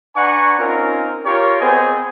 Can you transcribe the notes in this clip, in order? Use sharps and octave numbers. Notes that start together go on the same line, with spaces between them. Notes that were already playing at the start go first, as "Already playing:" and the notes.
D4 B4 F#5 G#5 A#5 C#6
C4 C#4 D#4 F4 A#4
F4 G4 A#4 C#5
B3 C4 G#4 C5 D#5 G#5